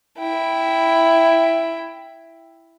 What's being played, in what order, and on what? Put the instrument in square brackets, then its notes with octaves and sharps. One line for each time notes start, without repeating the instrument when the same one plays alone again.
[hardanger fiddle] E4 G5